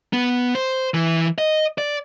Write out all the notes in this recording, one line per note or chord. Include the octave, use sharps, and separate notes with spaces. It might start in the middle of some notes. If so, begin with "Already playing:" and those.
B3
C5
E3
D#5
D5